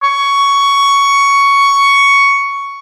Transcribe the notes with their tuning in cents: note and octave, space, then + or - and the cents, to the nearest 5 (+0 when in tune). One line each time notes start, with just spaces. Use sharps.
C#6 +10